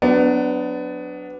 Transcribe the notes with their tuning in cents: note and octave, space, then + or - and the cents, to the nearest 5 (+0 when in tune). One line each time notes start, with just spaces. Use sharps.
F#3 +0 B3 +25 D4 +0